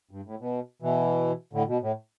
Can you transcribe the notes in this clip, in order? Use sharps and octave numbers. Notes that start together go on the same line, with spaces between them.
G2
A2
B2
B2 E3
A2 D3
B2
A2